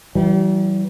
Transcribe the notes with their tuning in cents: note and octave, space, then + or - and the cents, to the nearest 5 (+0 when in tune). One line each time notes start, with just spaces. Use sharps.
E3 +0 G3 -45